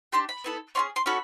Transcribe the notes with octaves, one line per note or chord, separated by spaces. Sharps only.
D4 G4 C6
B5
B3 E4 A4
C#4 F4 G#4 C6
C6
C#4 F#4 A4 B5